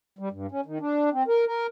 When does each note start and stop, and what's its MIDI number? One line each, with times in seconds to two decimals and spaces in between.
0.19 0.29 55
0.31 0.47 43
0.51 0.61 61
0.66 0.78 51
0.81 1.09 62
1.13 1.23 60
1.28 1.45 70
1.46 1.67 70